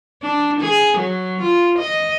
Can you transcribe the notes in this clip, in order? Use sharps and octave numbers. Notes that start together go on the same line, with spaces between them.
D4
G#4
F#3
F4
D#5